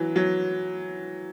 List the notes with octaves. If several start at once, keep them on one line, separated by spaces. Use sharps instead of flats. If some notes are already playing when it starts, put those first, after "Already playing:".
Already playing: E3 F#3
F#3